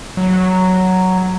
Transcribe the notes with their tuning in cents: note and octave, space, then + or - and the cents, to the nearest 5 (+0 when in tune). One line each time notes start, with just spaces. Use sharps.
F#3 +5